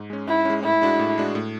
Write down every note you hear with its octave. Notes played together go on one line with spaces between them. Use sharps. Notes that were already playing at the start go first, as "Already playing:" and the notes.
Already playing: G#2
G#3 C#4
G#2 E4
G#3 C#4
A2 E4
G#3 D4 F#4
A2
G#3 D4 F#4
A2